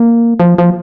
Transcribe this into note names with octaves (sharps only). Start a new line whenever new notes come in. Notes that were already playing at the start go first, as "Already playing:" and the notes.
Already playing: A#3
F3
F3